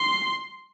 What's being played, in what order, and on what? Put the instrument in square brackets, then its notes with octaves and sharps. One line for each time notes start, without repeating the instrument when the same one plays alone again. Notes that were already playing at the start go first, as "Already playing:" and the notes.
Already playing: [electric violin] C6